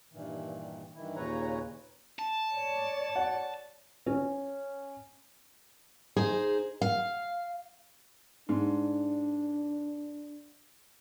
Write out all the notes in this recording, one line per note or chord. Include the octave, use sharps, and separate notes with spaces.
G2 A#2 D#3 E3
G2 D#3 E3 E4
D#2 A#2 C#3 B4 C#5 A#5
A5
C#5 D5
F#5
C#4
D#4 G#4 C5
F5
G#2 D4